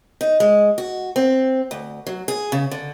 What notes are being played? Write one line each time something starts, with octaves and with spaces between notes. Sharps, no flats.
D#4
G#3
F#4
C4
D2
F#3
G#4
C#3
D3